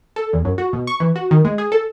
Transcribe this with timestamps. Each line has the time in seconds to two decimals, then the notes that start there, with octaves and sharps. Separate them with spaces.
0.16 A4
0.33 E2
0.45 F#2
0.58 F#4
0.73 B2
0.87 C#6
1.00 E3
1.16 F#4
1.31 D#3
1.45 G#3
1.58 G#4
1.72 A4